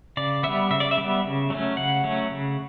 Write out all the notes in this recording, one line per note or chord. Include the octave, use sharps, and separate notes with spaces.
C#3 D5
G3 B3 E5
C#3 E5
D5
E5
G3 B3
C#3
F#3 A3 C#4
C#3 F#5
F#3 A3 C#4
C#3